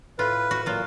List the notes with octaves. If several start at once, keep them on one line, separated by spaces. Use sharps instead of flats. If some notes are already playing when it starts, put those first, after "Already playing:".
A2 F4 B4
F#4
A#2 F#3 F4